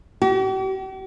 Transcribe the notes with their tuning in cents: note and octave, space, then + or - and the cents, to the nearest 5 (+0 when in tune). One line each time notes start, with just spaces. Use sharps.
G4 -45